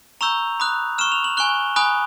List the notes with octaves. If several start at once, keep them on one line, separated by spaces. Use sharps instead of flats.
A#5 C#6 E6 G6 F7
B5 D#6 F#6
C#6 F6 E7
F7
F#7
G#5 C#6 F#6 G7
G#5 B5 D#6 F#6